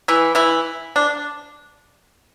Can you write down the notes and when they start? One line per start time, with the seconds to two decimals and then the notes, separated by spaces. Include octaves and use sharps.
0.08 E3 E4
0.35 E3 E4
0.96 D4